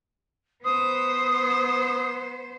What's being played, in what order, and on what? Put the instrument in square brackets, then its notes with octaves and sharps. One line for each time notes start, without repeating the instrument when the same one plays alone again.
[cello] B3 C5 [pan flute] D#6